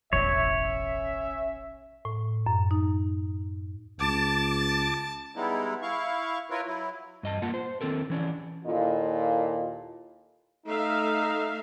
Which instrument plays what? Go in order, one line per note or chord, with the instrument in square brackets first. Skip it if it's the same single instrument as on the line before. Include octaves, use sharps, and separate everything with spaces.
[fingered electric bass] E1 A1 E2 [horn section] C#4 E5 [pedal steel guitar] C#5
[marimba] A2
F#2
D#4
[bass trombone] C#2 [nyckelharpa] A5 [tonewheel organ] D6 A6
[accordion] G3 G#3 B3 D#4 E4
E4 F5 C#6
E4 F4 A#4 B4 C#5
F#3 E4
[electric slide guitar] G2 D#5 A5
A#3 F4 F#5 A5
C5
D#3 C4 A4 A#4
E3 C#4 D4
[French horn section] D#2 A#2 E4 F4 A4 D#5
[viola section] A3 E5 F5 [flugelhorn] D#4